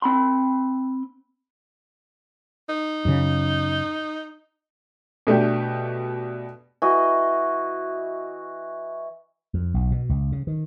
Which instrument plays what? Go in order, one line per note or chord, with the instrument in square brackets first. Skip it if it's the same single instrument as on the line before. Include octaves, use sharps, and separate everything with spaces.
[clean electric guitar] C4 B5 C6
[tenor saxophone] D#4
[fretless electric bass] F#2 C#3
[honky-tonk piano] B2 A3 D4 G4
[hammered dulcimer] E3 F#4 D#5
[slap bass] F2
B1
B2
C#2
C#3
D#3